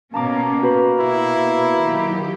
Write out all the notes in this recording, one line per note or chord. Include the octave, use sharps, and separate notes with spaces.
B2 A#3 C#4 A5 A#5 D6
F#4 B4 B5
B2 E4
D#3 F#3 G4